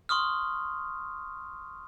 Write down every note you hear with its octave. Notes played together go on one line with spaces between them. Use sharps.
C6 C#6 D#6 F6